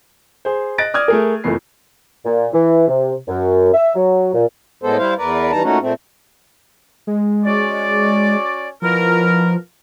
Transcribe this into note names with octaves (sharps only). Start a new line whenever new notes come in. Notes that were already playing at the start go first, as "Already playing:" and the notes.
G#4 C5
D#5 F#6 A6 A#6 D7
D5 D#6 F6 G#6
A3 G#4 A#4
F#1 F2 E3 A3 B3 C7
A#2
E3
C3
F#2
E5
F#3
A#2
A2 G#3 B3 A4 C5
G3 E4 C5 F5
E2 A#4 B4 D5
E3 G3 D#4 A5 A#5
A#2 A3 C#4 D#4 F#4
A#2 A3 C4
G#3
C#4 F#4 D5
B2 F3 E4 A#4